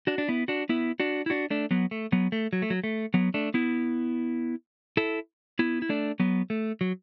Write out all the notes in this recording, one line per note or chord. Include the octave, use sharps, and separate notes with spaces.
D4 F#4
D4
B3 E4
D4 F#4
B3 E4
D4 F#4
E4
D4 F#4
A3 D4
F#3 B3
A3
F#3 B3
A3
F#3
A3
F#3
A3
F#3 B3
A3 D4
B3 E4
E4 A4
B3 E4
E4
A3 D4
F#3 B3
A3
F#3